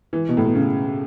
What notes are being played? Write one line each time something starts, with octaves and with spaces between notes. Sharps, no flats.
E3
B2
A2
B2
C#3